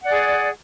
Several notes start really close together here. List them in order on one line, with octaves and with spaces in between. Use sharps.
F#5 D5 G#4